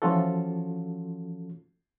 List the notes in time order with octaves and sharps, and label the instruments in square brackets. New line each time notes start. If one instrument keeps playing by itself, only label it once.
[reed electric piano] E3 F3 C#4 F4 F#4 A4